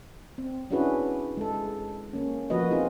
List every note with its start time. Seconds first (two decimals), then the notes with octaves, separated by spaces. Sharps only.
0.38 C4
0.71 C#4 D4 E4 F#4 G#4 B4
1.37 G#3 A4
2.13 A#3 C#4
2.50 F3 A#3 F#4 B4 D#5
2.71 C4 D#4 F4 G#4